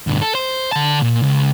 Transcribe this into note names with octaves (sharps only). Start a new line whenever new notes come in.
D2 G2
A4
C5
D3 A5
A#2
C#2